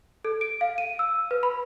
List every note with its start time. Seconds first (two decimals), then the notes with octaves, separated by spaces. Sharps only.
0.25 A4
0.41 D7
0.61 F5
0.78 D#7
0.99 E6
1.31 B4
1.43 B5